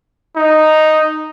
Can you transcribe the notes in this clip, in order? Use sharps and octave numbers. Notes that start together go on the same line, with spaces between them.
D#4